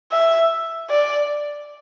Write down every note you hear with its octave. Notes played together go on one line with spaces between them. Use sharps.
E5
D5